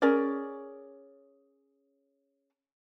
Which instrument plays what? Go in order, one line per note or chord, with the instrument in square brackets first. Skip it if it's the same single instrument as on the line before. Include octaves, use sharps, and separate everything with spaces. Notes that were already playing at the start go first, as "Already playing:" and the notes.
[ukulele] C#4 G#4 A#4 D5